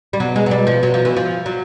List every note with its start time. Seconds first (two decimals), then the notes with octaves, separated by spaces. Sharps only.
0.13 G3
0.20 B2 F#3
0.36 G#3
0.46 F#3
0.51 G3
0.67 F3
0.83 F#3
0.94 F3
1.05 E3
1.17 F3
1.46 F#3